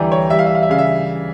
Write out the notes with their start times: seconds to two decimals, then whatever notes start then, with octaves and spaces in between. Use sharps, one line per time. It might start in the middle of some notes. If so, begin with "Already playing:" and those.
Already playing: D2 E3 G3 D5 G5 A#5
0.12 C#5
0.30 G3 E5
0.39 F5
0.46 E5
0.55 F5
0.63 E5
0.70 C#3 F5
0.78 E5